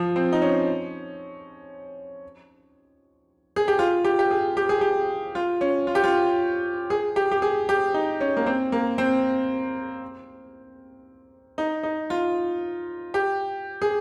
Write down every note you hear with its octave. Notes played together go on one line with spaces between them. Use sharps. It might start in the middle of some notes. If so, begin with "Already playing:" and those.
Already playing: F3
C4
D#4
C#4
G#4
G4
F4
G4
G4
G#4
G4
G#4
G4
F4
C#4
F4
G4
F4
G#4
G4
G4
G#4
G4
D#4
C#4
A#3
C4
A#3
C4
D#4
D#4
F4
G4
G#4